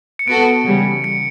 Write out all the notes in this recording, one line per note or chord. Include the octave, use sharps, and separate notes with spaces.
C#7
B3 F#4 A4 D7
C#3 E3 G3
C#7